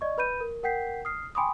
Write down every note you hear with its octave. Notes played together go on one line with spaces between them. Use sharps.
D5 D#5 C#6
B4 B5 G6 D#7
A#4
A#4 F#5 G5 G6 B6 C7
D#6 F6 C7
G5 G#5 B5 C6 D6 D#6